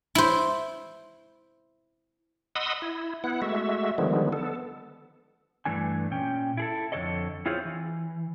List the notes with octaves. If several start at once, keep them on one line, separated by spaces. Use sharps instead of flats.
E4 C5
D#5 F#5 B5 C6 D#6 E6
E4
B3 E4 F#5
G#3 A3 F#4 E5
D3 D#3 F3 G3 G#3 B3
B3 A4
G2 B2 E3 A3 D4 G#5
A#2 C#4 G5
E4 G#4 A4
F2 G#2 D3 A4 C#5 D#5
C4 E4 F4 G#4 C5 C#5
E3